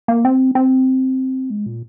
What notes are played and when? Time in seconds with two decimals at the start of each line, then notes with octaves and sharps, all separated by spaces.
0.08 A#3
0.25 C4
0.55 C4
1.50 G#3
1.66 A#2